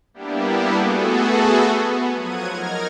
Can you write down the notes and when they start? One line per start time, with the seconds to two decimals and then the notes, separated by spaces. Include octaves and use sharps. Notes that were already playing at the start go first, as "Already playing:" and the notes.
0.14 G3 A#3 B3 D4 E4 G4
0.75 A3 B3 F#4 G#4 A4
1.84 B3
2.15 F3 F#3 F#5 G#6 D#7
2.49 D#4 A#4 F6 G#6 A#6